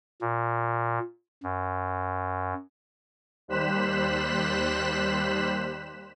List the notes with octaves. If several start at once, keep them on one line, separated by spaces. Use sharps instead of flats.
A#2
F#2
D#2 G3 C5 F#6 B6 E7